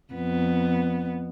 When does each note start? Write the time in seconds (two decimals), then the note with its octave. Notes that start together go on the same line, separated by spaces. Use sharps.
0.13 F2 B3